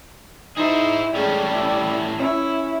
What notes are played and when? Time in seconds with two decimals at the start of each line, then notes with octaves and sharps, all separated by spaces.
0.57 D#4 E4 G#4 C5
1.15 A2 G3 G#3 C#4
1.54 E4
2.19 C#4 E4